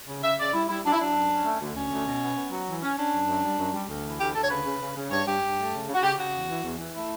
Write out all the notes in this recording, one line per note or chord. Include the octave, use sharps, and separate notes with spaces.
C#3
C#3 E5
C#3 D5
G3 E4
G3 E4
F#3 D4
E4
F#3 D4
F#2
C#4
A3
D2
D2 C#4
D2
B2
B3
B3
F#3
E3
C#4
C#4 D4
F#2
F#2
G3
F#2
G3
D2
E3
D2 G4
D2 A4
C#5
C#3 B4
C#3
C#3
C#3
G2 C#5
G2 G4
G2
A3
C#3
C#3
F#4
C#3 G4
C#3 F#4
E2
E3
E2
E3
A3 E4